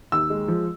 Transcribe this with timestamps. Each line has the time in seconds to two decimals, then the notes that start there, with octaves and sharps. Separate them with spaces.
0.12 D#2 E6
0.30 G#3
0.48 F3